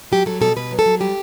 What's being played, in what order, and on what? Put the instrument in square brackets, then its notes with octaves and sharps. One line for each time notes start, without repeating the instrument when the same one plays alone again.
[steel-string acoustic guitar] F#3 G4
F#3 A4
B2 A4
B2 B4
F#3
A4
F#3
G3 G4